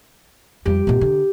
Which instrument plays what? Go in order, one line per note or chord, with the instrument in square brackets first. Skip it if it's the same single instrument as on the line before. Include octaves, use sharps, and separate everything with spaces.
[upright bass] F2 G3 [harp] G4
[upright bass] A#2 B3
D3